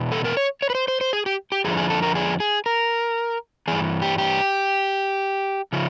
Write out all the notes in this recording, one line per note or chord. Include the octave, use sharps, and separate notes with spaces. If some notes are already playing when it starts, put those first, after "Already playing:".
Already playing: E2 B2
A4
A#4
C#5
C#5
B4
C5
C5
C5
G#4
G4
G4
F2 D3 F3 G#4
G#4
A4
A#4
G#4
G#4
A#4
G2 E3 G#4
G4
G4
C#3 F3